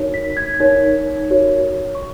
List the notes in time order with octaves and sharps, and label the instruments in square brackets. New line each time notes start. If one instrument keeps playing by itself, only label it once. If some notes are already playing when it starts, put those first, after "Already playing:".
Already playing: [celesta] D#4 F#4 A#4 C#5
B6
G#6
D#4 A#4 C#5
F#4 A#4 C#5
C#6